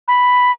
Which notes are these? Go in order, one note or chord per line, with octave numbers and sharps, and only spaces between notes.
B5